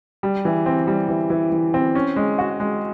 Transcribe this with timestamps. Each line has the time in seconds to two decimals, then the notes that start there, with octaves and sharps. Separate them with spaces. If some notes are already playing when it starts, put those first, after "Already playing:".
0.23 G3
0.45 E3
0.66 C4
0.87 G3
1.08 E3
1.30 E3
1.52 E3
1.74 C4
1.95 C#4
2.16 G#3
2.38 F#4
2.60 G#3